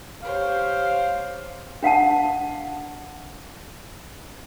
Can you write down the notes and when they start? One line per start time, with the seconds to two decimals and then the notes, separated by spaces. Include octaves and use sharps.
0.23 G4 C5 C#5 F5
1.83 D4 F5 F#5 A5